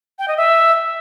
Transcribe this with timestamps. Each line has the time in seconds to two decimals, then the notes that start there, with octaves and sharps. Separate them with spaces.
0.19 G5
0.28 D#5
0.37 E5